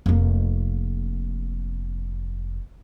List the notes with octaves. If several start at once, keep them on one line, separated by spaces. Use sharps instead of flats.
F1 A#3